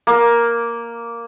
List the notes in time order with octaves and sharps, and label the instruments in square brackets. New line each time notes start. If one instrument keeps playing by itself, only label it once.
[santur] A#3